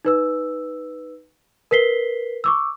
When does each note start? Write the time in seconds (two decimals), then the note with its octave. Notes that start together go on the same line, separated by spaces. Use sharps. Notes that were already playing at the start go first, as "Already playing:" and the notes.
0.05 D#4 B4 E6
1.71 A#4 B4 B6 C7 G7
2.44 C#6 D6 E6